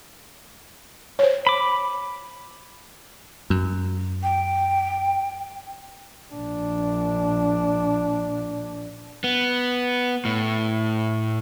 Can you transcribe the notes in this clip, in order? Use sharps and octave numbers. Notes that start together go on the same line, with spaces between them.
C5 C#5
B5 D6
F#2
G5
A#1 D4
B3
A2